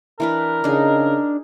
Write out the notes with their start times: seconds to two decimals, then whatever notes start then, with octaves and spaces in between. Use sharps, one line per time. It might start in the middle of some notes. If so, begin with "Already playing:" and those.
0.20 E3 D4 A#4 B4
0.64 C#3 D4 D#4 G#4